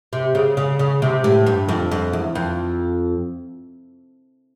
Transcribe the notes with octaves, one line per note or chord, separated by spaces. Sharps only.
C3
C#3
C#3
C#3
C3
A2
G2
F2
F2
E2
F2